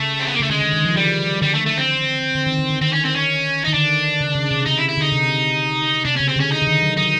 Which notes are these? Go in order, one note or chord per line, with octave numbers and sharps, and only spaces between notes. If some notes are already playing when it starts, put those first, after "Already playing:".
Already playing: C#3 A3
C4
B3
A#3
C#3 A3
D3 G#3
D#3
D#3
F3
E3 G3
D3 G3
A3
A3
C4
D3
D#3
D3
D3
D#3 C4
C#4
C4
C#4
D#3 D#4
D3 D4
C#3
C#3
C3
C#3 D#4
E4
E4
D3 D#4
C3
C3 D4
C#3 C#4
C4
D3 C#4
D#4
D3
D#3
F#3
F#3 D#4